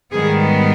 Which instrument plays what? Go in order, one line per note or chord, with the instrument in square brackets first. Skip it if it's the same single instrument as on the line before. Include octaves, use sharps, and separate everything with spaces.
[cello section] G#2 D#3 G3 B3 G#4